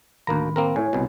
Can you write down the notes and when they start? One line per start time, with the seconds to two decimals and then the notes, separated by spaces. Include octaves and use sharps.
0.27 D2 A2 D#3 A#3 A#5 B5
0.56 A#3 C4 A#4
0.76 A2 E4 C#5 G#5
0.93 C2 B2